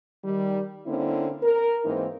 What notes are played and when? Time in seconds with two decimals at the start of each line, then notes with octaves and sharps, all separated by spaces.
0.24 D#3 G3
0.86 D3 A#3 C4 C#4 E4
1.43 A#4
1.85 G#2 E3 A#3 C4 D#4